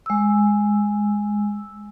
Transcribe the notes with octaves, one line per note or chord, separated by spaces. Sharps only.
G#3 E6